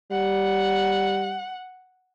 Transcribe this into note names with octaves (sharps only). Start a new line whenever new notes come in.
G3 F#5